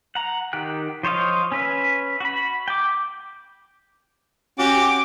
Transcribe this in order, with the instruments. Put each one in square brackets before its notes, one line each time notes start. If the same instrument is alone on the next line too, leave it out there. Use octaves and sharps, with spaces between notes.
[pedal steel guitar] F#5 A#5
D#3 G4 G5 F#6
F3 C5 C#5 D#5 F5
C#4 B4 E5
F#4 B5
G5 D6
[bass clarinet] C#4 [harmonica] F#4 G4 [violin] D6